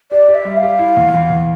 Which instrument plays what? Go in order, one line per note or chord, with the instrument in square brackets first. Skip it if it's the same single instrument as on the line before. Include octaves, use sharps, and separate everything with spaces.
[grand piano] G4 [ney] D5
[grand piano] G4
[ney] E5
[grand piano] G3
[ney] F5
[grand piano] G4
E4
E2
E3
E2